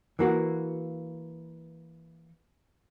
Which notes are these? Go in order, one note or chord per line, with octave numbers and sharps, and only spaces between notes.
E3 A#3 F#4